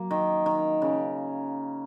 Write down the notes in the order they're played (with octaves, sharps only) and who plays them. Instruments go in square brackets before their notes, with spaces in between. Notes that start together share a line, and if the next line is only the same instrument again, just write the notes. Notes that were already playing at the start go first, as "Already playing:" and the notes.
Already playing: [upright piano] F#3 [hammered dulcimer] A#3
[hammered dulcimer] D#3
D#3
C#3